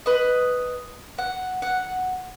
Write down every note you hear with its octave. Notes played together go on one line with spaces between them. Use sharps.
B4 D#5
F#5
F#5